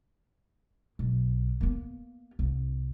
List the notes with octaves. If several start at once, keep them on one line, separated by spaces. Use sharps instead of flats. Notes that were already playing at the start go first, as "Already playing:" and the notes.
B1
A#3 B3
C2